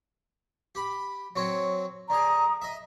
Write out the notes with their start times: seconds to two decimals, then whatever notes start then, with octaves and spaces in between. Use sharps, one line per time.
0.75 G4 B5
1.36 F#3 C4 C#5
2.10 D3 G#4 A#5 D#6
2.62 D#5 E5